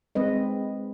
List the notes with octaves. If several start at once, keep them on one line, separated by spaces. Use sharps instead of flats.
G#3 C4 B4 D#5